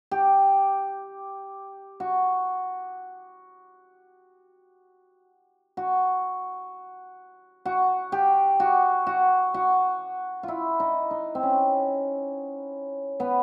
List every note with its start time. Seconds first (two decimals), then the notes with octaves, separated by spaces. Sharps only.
0.11 G4
2.00 F#4
5.77 F#4
7.65 F#4
8.12 G4
8.60 F#4
9.07 F#4
9.54 F#4
10.43 E4 F4
10.80 D#4
11.11 D#4
11.35 C4
11.43 C#4
13.20 B3